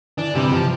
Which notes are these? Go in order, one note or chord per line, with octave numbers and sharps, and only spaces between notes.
E3 D4
C3 G3
C3 F3